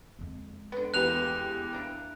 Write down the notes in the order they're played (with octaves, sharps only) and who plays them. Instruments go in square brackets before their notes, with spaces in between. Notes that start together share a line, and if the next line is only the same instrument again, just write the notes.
[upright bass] F2 G#3
[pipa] D3 B3
[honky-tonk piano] E2 G4 [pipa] D3 A#3 B4 [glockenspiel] F#6 F7
[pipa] A#3 D4 E4